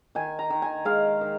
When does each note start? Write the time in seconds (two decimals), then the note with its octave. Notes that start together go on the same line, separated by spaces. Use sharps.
0.15 D#3 G#5
0.39 A#5
0.50 D#3
0.62 G#5
0.85 G#3 F5
1.21 D#3